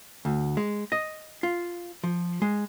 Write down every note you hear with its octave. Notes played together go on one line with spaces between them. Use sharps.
D2
G#3
D#5
F4
F3
G#3